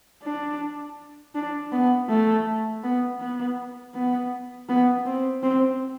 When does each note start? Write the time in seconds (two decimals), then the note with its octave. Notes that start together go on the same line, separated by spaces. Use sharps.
0.23 D4
1.35 D4
1.72 B3
2.09 A3
2.83 B3
3.21 B3
3.94 B3
4.69 B3
5.06 C4
5.43 C4